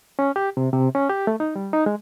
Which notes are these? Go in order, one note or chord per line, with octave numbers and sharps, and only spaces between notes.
C#4
G4
C3
C3
C#4
G4
A3
D#4
G3
D#4
G#3